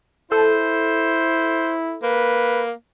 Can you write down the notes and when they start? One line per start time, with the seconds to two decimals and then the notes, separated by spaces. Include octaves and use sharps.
0.32 E4 A4 C5
2.03 A#3 B4